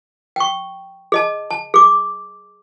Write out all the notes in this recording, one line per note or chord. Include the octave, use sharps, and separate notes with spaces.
G5 C#6
G#4 D#5 A5
A5
G#4 D6